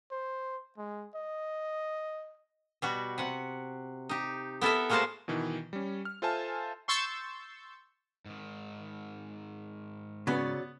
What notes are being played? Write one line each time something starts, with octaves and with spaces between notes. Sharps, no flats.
C5
G#3
D#5
B2 G3 F#4
C3 F#5
D#4 G4
B3 E4 A4 A#4 E5
G#3 A#3 F#4 A#4 C5 A5
B2 D#3 E3
G3 C#4
F6
F4 A4 C5 E5 G#5 A5
C6 C#6 E6 G6 A6
G#2 D#3
C#3 F#3 B3 C#4 D5